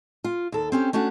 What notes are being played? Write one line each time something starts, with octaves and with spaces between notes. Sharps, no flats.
F4
D#2 A4
C4 C#4 G4
A3 C#4 D4 F#4